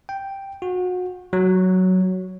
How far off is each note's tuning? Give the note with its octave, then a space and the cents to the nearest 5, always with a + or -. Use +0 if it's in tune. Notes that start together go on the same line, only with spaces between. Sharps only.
G5 +0
F#4 -30
F#3 +5